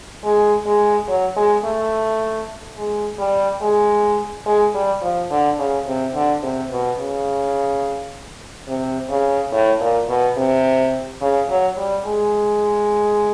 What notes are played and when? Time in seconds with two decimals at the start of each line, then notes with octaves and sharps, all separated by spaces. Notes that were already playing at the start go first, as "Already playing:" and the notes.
0.24 G#3
0.66 G#3
1.08 F#3
1.36 G#3
1.64 A3
2.77 G#3
3.19 G3
3.61 G#3
4.46 G#3
4.74 G3
5.02 F3
5.30 D3
5.59 C#3
5.86 C3
6.14 D3
6.43 C3
6.71 B2
6.99 C#3
8.68 C3
9.10 C#3
9.52 A2
9.80 A#2
10.09 B2
10.37 C3
11.21 C#3
11.49 F#3
11.78 G3
12.05 G#3